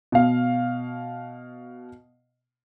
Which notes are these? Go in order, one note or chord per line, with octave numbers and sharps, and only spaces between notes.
B2 F5